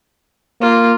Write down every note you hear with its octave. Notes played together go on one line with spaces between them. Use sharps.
A#3 F4